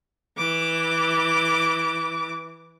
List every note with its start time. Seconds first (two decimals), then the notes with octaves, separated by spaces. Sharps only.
0.38 E3 D6